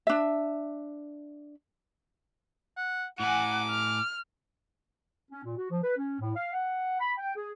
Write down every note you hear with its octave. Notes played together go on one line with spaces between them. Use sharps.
D4 E5
F#5
A2 F#5 G#5 D6
F6
C#4
A#2
F#4
F3
B4
C#4
A2
F5
F#5
B5
G5
G#4